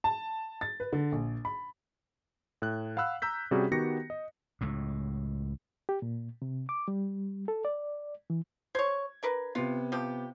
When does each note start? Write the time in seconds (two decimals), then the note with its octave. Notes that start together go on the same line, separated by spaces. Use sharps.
0.04 A5
0.61 A6
0.80 B4
0.93 D3
1.12 A#1
1.45 B5
2.62 A2 F#6
2.97 F5 F#5 B5 E6 F#6
3.22 A#5 E6 G6 B6
3.51 C3 G3 C#4 F#4 G#4
3.71 D#3 B3 F#4 G4 A#6 C#7
4.10 D#5
4.61 C#2 A2
5.89 G4
6.02 A#2
6.42 C3
6.69 D6
6.88 G3
7.48 A4
7.65 D5
8.30 E3
8.75 C5 C#5 G#6
9.23 D4 A#4 B4
9.55 C3 B3 F4
9.92 F3 G4